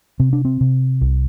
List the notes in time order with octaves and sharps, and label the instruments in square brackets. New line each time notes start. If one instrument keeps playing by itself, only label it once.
[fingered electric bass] C3 C4
D4
C4
C3
C2